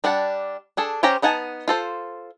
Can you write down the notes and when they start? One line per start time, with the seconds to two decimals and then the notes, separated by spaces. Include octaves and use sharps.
0.04 G3 D4 D5 F#5 A5
0.77 D4 G#4 A4
1.03 C#4 G4 C5 G5 A#5
1.22 B3 D#4 F#5 G#5 A5
1.68 F4 A4 C5